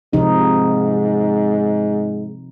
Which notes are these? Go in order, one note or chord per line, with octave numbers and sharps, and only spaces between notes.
G#2 C3 F3 D#4